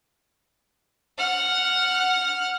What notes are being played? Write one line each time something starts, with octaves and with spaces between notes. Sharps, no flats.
F#5 F6